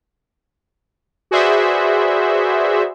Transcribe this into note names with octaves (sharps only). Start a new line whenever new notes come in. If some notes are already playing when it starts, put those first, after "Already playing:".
F#4 G#4 B4 C5 D5 E5